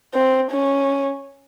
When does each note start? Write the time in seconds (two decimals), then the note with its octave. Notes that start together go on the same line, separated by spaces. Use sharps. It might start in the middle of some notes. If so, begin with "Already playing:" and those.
0.15 C4
0.51 C#4